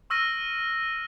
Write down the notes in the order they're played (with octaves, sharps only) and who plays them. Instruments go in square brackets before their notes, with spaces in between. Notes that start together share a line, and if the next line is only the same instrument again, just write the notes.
[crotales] C#6 E6 F6 A#6 D#7